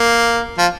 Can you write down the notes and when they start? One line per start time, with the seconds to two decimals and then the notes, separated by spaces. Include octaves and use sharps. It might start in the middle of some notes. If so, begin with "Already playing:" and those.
Already playing: A#3
0.58 F3